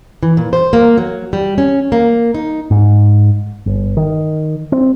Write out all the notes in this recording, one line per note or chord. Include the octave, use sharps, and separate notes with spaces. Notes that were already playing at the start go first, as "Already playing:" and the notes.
E3
A#2
C5
A#3
F#3
G3
C#4
A#3
D#4
G#2
G1
D#3
C4